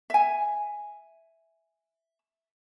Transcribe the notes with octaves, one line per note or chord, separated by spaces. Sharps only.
E5 G#5